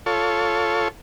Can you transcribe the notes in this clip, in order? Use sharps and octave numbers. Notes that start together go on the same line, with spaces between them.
F4 A4 C#5